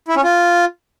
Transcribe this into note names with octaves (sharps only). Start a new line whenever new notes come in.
E4
C#4
F4